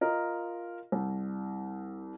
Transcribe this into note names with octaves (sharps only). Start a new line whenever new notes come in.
F4 A#4 D#5
C2